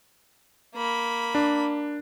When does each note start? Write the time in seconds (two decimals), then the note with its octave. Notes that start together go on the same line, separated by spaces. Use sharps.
0.75 A#3 B5
1.35 D4